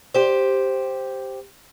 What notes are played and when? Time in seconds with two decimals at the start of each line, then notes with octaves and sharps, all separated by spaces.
0.15 G4 C5